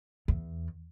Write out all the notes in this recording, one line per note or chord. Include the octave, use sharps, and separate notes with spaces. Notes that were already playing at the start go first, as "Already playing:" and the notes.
E2